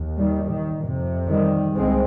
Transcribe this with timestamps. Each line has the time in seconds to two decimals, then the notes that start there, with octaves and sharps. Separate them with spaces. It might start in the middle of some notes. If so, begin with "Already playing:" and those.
Already playing: D#2
0.17 D#3 G3
0.49 D#3
0.80 F2 C3
1.28 D#3 G3
1.75 C2 G#3 C4